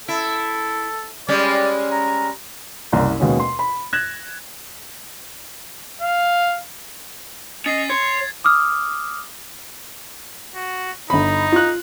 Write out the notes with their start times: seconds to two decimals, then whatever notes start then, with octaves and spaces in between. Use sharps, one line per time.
0.08 E4 A4
1.28 G3 G#3 C#4 D5
1.92 A#5
2.92 F#1 C2 A#5 C6
3.20 D#2 B2 G#3 C#4
3.40 C6
3.59 B5
3.93 F#6 G#6 A#6 E7
6.02 F5
7.66 C#4 D#5 A6 C7
7.90 C#5 C6 G#6
8.44 D6 D#6 F6
10.55 F#4
11.10 G1 D#4 B5
11.52 F4 F#6